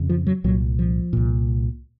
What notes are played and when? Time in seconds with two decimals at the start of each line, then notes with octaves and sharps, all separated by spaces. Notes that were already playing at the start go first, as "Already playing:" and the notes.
Already playing: F2 C#3
0.09 F3
0.27 F#3
0.44 C2 A#2 F#3
0.79 F3
1.13 C2 A#2